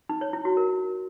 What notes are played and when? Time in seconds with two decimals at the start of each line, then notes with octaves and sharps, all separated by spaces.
0.09 D#4
0.21 C#5
0.33 E4
0.45 F#4
0.57 A#4